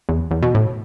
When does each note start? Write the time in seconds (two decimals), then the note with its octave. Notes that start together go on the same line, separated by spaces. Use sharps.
0.09 E2
0.31 E2
0.43 B2
0.55 A2